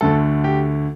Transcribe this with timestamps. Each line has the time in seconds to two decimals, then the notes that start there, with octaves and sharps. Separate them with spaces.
0.01 D2 D3 A3 A4
0.44 G4